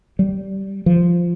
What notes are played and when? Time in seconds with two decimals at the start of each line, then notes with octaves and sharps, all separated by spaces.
0.19 G3
0.86 F3